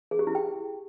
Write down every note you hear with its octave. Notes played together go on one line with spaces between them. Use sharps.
G#4
G4
E4
G5